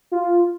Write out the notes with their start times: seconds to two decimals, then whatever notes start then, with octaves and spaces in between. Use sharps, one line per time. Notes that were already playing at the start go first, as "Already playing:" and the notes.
0.11 F4